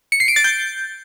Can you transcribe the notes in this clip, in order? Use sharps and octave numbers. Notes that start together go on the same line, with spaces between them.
C#7
C7
D7
A6
G6